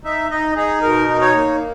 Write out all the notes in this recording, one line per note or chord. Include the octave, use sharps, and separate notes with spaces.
D#4 E5
D#4 D#5
D#4 G#4
B2 A#4
D#4
C#5
A#3